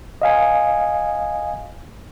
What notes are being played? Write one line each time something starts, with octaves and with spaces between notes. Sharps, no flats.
D#5 F5 G#5